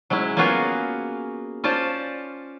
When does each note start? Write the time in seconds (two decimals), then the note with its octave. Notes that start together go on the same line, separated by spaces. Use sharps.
0.10 F#3 G#3 C#4 E4
0.37 A#3 B3 C#4 F4 F#4 G#4
1.64 C#4 F4 C5 D5 A5